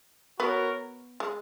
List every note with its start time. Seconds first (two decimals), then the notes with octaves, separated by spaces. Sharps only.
0.40 B3 F#4 A#4 C#5
1.20 G#3